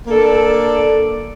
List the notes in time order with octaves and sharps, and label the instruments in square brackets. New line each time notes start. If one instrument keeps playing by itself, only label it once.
[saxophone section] A#3 D4 A4 D5